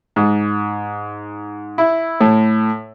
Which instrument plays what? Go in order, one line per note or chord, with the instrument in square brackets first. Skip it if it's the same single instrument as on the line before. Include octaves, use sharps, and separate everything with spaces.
[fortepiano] G#2
E4
A2